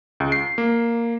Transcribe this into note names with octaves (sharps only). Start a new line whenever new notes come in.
C#2
C7
A#3